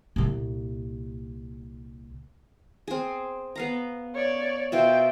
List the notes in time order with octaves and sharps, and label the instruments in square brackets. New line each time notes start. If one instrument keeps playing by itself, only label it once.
[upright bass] C2 A#2
[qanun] C4 G#4
B3 F5 A#5
[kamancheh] C#5 D5
[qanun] B2 F4 C5 [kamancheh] E5 G5